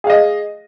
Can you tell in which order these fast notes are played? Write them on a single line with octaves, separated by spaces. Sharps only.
G#4 F5 D#5